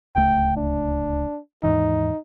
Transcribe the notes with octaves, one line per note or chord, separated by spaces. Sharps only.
D1 C#2 A3 G5
D4
D#2 G#2 E3 D#4